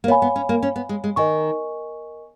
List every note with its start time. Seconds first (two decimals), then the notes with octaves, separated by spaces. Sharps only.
0.04 A#3
0.08 B3 C#5 F5 G#5 B5
0.22 B3
0.36 C#4
0.49 A#3
0.63 C#4
0.76 B3
0.89 G#3
1.04 G#3
1.16 D#3 A#4 D#5 G#5 C#6